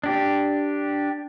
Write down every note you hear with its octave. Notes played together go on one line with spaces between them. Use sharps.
D4 G4